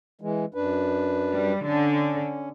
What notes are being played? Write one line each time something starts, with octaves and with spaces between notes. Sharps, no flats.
E3 G#3
F#2 D4 B4
G3
D3 C#4